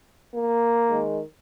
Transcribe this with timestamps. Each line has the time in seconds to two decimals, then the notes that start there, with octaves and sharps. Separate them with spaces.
0.35 A#3
0.85 D#3 G#3